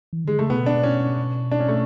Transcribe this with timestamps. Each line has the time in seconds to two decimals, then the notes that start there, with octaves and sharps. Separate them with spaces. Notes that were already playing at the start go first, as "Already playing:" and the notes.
0.13 E3
0.25 D3 G#3
0.38 C#3 A3
0.50 B2 B3
0.66 D4
0.83 C#4
1.52 D4
1.60 C#4
1.69 A3